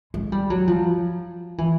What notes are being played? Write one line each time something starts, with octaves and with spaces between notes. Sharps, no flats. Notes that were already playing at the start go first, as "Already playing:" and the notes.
G#3
G3
F#3
F3
E3